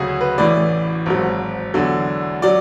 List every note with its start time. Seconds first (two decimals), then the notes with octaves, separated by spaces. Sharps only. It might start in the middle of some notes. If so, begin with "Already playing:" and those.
Already playing: D2 C#3 F#3 F#4 G#4
0.21 B4
0.38 A1 A2 E3 D5
1.06 G#1 G#2 F#3
1.74 E2 D3 F#3
2.42 F#3 D5